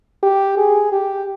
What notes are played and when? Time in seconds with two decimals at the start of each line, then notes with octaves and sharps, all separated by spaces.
0.23 G4
0.58 G#4
0.92 G4